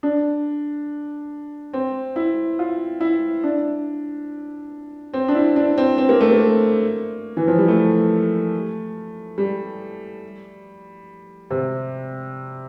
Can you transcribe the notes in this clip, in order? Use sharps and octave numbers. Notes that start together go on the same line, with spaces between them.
D4
C4
E4
F4
E4
D4
C4
D4
E4
D4
C4
C4
A#3
A3
A#3
E3
F3
G3
A3
G3
C3